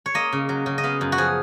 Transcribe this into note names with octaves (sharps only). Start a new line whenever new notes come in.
C#5
A#3 D#5
C#3
F#3
C#3
D#5
B3 F5
F#2
F#4
F3 G#4